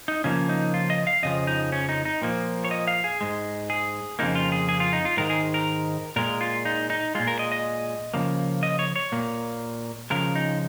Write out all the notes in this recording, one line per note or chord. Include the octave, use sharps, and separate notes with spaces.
D#4
C#3 F3 A#3 C#4
D#4
F4
D#5
F5
F2 C#3 F3 D#5
D#4
C#4
D#4
D#4
A#2 F3 A#3
C#5
D#5
F5
G#4
G#2 G#3
G#4
F2 C#3 F3 A#3 D#4
F4
G#4
G#4
F4
D#4
F4
G#2 D#3 G#3 A#4
G#4
A#4
A#2 G#3 A#4
F4
D#4
D#4
A#2 G#3 F4
A#4
D#5
D#5
C#3 F3 A#3
D#5
C#5
C#5
A#2 A#3
C#3 F3 G#3 A#4
D#4